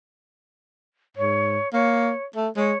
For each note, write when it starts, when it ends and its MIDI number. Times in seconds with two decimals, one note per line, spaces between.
1.17 1.59 44
1.17 1.72 73
1.73 2.12 58
1.73 2.23 73
2.36 2.49 57
2.56 2.73 56
2.56 2.78 73